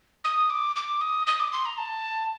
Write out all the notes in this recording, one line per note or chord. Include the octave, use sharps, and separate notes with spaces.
D#6
D6
D6
D#6
D#6
D6
C6
A#5
A5